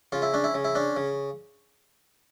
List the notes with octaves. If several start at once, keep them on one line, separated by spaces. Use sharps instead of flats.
C#3 F4
E4
C#4 D4
E4
C#3
E4
C#4 D4
C#3